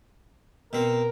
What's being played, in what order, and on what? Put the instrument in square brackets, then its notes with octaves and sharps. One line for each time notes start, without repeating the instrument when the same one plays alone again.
[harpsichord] B2 C4 [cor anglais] A#4